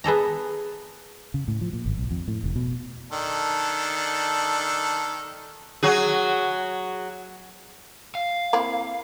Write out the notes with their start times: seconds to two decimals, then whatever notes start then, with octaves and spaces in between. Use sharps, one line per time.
0.04 B3 G#4 A4 A#5
1.34 C#3
1.48 A2
1.61 F3
1.73 A#2
1.86 G#1
1.98 B1
2.11 F2
2.28 A2
2.44 F1
2.56 B2
3.12 D#3 D4 A4
5.83 F#3 F#4 G#4
8.15 F5
8.53 A#3 C4 E4